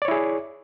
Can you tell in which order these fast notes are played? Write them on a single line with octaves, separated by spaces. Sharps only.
D5 C#5 E4 G#4